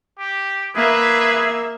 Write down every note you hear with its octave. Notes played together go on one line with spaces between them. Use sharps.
G4
A#3 G#4 B4 E5